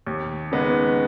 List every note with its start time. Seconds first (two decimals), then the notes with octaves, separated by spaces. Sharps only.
0.06 D#2
0.52 C#3 G#3 B3 D#4